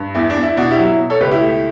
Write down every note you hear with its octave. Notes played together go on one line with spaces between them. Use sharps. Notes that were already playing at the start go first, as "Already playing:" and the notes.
Already playing: G2
E2 E4
D4
E2
E4
B2 D4 F#4
E4 G4
F#3
E4
B2
A4 C#5
C#2 G4 B4
E4 G4
A3